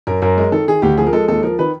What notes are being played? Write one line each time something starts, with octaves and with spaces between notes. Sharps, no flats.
F#2 A#4
F#2 A#4
G#3 A#4
D#3 A4
D#3 G#4
D2 G4
F3 G#4
A#4
G#3 A4
D#2 A4
F3 A#4
D#3 B4